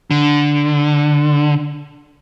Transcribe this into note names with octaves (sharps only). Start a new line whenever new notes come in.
D3